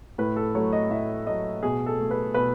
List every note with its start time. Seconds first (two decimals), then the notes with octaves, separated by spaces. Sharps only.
0.18 A2 B4
0.36 A4
0.55 F#3 A3 C#5
0.73 D#5
0.90 A2 E5
1.27 F#3 A3 D#5
1.63 B2 G#4
1.86 A4
1.99 A3
2.11 B4
2.34 B2 B4